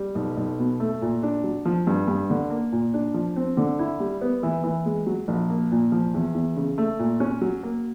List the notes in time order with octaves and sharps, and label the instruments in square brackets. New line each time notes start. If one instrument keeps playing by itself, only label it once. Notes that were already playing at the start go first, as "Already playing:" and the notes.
Already playing: [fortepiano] G3
B1
B1
B2
A3
A#2
D4
F#3
F3
G2
G2
D3
A#3
A#2
D4
F3
C4
D3
E4
G3
B3
E3
E3
G#3
F#3
A#1
A#3
A#2
F3
E2
E2
C#3
A3
A#2
C#4
F#3
A#3